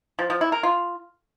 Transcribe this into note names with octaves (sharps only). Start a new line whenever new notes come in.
F3
F3
E4
A#4
F4